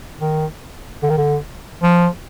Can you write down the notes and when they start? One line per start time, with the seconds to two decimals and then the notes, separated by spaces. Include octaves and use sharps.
0.21 D#3
1.03 D3
1.10 D#3
1.17 D3
1.83 F3